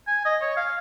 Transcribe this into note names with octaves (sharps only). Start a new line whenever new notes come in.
G#5
D#5
C#5
F5